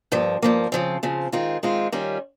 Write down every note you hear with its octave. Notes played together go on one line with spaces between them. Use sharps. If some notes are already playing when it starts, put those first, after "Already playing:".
G2 F3 A#3
G2 F3 A#3
C#3 F3 C4
C#3 F3 C4
D#3 G#3 C4 F4
D#3 G#3 C4 F4
D#3 G3 C#4 F4